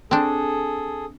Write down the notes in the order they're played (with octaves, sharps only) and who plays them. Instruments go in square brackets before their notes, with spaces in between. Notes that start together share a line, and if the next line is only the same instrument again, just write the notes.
[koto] C4 D4 [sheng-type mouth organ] G#4 A4